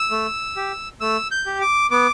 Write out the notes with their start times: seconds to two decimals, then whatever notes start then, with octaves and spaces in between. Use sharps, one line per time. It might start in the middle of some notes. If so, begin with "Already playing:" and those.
Already playing: E6
0.11 A3
0.56 G4
1.01 A3 E6
1.31 G6
1.46 G4
1.61 D6
1.91 B3 D6